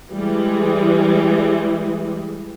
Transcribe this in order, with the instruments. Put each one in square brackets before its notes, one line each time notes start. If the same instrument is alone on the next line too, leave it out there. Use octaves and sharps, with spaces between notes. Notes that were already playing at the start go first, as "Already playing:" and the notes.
[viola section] E3 G3 G#3